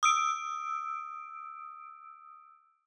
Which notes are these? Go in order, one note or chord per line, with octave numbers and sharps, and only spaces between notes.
D#6 E6 D7